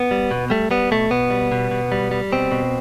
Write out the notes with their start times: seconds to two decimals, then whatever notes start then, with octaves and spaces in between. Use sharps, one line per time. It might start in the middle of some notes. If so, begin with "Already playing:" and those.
Already playing: B3
0.11 G3
0.31 B2
0.50 G3 A3
0.71 G3 B3
0.91 B2 A3
1.10 B2 B3
1.30 G3
1.52 B2
1.71 B2
1.92 G3
2.11 G3
2.32 B2 C4
2.52 B2